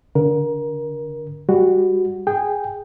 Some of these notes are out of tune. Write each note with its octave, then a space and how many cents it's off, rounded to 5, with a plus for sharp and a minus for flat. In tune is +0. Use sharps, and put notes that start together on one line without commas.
D3 -30 A#4 +20
G3 +20 F#4 +0
G#4 -10 G5 +0